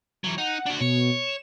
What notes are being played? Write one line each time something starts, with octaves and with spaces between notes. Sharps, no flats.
E3 F#3
D#4 F#5
D4 F#4
B2 C#5
E7